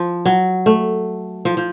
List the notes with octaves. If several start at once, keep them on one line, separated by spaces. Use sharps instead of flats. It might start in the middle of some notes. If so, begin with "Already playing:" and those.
Already playing: F3
F#3
A3
F3
F3